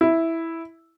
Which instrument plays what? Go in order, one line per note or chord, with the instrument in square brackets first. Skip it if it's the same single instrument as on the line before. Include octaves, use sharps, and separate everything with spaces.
[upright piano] E4